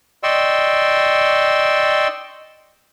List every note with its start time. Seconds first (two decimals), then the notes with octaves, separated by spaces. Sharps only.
0.23 D5 D#5 G5 C6 C#6 E6